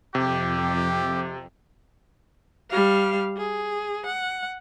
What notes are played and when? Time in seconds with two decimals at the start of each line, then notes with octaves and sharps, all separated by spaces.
0.15 F2 C3 G4
2.71 G3 F5
3.37 G#4
4.06 F#5